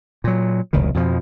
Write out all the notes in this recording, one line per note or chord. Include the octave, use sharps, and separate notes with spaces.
A#2 F#3
F1 C#2 B2 D#3
F2 B2 F3